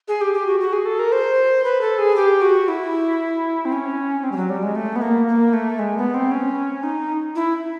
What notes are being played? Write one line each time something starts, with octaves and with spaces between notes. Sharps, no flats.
G#4
G4
G4
F#4
F#4
G#4
A4
A#4
C5
B4
A4
G#4
G4
F#4
E4
C4
C#4
C4
G3
F#3
G3
G#3
A3
B3
A#3
A#3
A3
G#3
B3
C4
C#4
D#4
E4